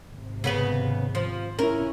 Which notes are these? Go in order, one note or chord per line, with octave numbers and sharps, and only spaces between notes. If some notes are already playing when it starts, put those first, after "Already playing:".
G#1 C3
C#3 B3 B4
F3
C#4 E4 A#4